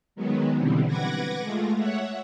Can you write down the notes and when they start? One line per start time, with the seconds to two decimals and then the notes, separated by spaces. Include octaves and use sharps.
0.16 D#3 F#3 G#3 B3
0.56 B2 D3 E3 G3 C4
0.87 B4 F#5 D6 G#6 A#6
1.41 G#3 A3 F4
1.77 C#5 E5 F#5